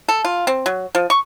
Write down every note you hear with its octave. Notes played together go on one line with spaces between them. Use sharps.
A4
F4
C4
F#3
F3
C#6